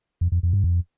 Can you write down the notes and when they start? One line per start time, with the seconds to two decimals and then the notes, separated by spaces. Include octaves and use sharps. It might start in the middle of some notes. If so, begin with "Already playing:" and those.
0.21 F2
0.32 F2
0.43 F2
0.53 G2
0.64 F2